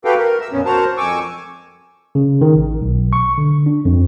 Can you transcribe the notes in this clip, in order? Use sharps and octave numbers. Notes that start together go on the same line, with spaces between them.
F#4 G4 A4 B4 F5 G5
A#4
E5 E6
F2 A#2 B3 C#4
F#4 A#4 C5 A5 A#5
F2 G#5 C#6 D6 E6
C#3
D#3
A1
B1
C#6
D3
D4
F2